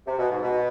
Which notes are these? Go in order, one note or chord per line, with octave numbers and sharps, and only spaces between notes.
C3
B2
G#2
B2